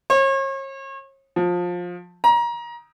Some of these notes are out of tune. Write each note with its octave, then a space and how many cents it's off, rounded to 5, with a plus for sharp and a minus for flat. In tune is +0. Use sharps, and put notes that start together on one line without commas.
C#5 -40
F3 +20
A#5 +25